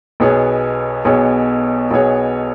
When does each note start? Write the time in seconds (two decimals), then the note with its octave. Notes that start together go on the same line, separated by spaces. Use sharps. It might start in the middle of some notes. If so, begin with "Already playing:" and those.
0.20 B1 B2 B3 G#4 C#5
1.05 B1 B2 B3 G#4 C#5
1.91 B1 B2 B3 G#4 C#5